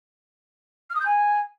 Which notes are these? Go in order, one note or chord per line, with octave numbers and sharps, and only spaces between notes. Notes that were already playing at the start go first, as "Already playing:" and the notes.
F6
D#6
G6
G#5